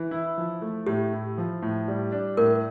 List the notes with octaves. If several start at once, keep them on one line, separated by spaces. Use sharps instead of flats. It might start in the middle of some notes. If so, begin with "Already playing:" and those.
Already playing: E3
E4
F3
A3
A2 G4
E4
F3
A2
G3
D4
A2 A#4